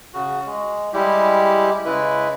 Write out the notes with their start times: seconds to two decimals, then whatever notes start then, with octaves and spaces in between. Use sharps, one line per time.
0.14 C#3 F#4
0.46 G#3
0.93 G3 G#3 E4 G4
1.85 C#3 G#3 E4 B4